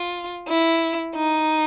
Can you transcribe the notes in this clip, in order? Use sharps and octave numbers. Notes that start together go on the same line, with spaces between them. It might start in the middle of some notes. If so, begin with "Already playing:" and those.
Already playing: F4
E4
D#4